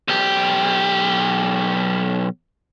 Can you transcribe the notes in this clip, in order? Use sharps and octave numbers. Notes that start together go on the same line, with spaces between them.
B1 G4